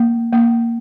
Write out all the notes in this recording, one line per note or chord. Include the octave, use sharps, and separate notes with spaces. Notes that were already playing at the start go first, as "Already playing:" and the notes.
Already playing: A#3
A#3